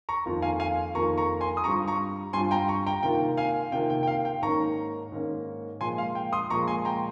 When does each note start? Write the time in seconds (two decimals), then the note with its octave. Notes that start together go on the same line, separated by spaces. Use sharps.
0.09 A#5 C#6
0.26 F2 D#3 A#3 F4
0.42 F5 G#5
0.60 F5 G#5
0.95 F2 D#3 A#3 F4 A#5 C#6
1.18 A#5 C#6
1.41 G#5 C6
1.57 D#6
1.64 G2 G3 C4 F4 A#5 C#6
1.88 A#5 C#6
2.33 G2 G3 C4 F4 G#5 C6
2.51 G5 A#5
2.68 A#5 C#6
2.87 G5 A#5
3.03 C3 D#3 A#3 F4 G5
3.37 F5 G#5
3.72 C3 D#3 A#3 F4 G5
3.90 G5
4.03 G5
4.07 F5
4.25 G5
4.42 G#2 D#3 A#3 C#4 A#5 C#6
5.12 G#2 D#3 A#3 C#4
5.81 A#2 F3 G#3 G#5 C6
5.98 F5
6.15 G5
6.33 C6 D#6
6.50 A#2 F3 G#3 A#5 C#6
6.68 G#5 C6
6.85 G5 A#5